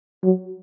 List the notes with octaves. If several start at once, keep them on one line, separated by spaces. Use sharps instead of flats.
F#3